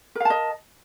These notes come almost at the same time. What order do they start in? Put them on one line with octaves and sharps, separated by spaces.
A#4 F5 A5 D#5